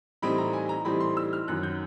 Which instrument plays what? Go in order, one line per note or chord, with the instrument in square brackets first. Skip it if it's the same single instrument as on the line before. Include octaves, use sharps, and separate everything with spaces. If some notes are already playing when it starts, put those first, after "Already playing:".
[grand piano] A2 E3 G3 C4 D#4 B5
A#5
G#5
A#5
A2 E3 G3 C4 D#4 B5
C6
E6
F6
F#2 D#3 F#3 F#6
G6